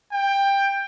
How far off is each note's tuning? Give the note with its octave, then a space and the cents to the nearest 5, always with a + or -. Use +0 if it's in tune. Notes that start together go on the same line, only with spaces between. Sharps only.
G5 +15